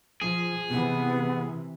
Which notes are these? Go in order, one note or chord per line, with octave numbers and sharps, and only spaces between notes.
F3 G#4
C3 E3 B3